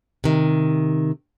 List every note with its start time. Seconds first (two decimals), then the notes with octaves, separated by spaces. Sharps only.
0.24 C3 D#3